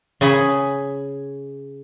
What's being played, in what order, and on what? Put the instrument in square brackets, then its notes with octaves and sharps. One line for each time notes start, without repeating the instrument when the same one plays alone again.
[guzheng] C#3 C#4 G#4 B5